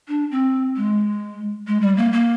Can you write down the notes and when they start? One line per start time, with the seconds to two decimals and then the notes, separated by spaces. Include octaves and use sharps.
0.08 D4
0.31 C4
0.77 G#3
1.67 G#3
1.82 G3
1.97 A#3
2.13 A#3